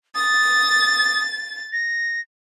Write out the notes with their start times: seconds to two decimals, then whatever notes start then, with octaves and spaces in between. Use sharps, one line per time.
0.15 D#6 A6
1.73 A#6